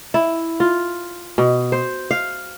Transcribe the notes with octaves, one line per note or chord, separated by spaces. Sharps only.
E4
F4
B2
C5
F5